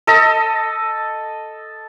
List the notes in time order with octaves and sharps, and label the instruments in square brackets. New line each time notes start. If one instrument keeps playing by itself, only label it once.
[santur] A4 D#5